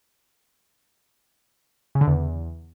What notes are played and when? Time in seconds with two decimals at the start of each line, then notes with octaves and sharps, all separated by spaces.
1.95 C#3
2.01 D3
2.07 E2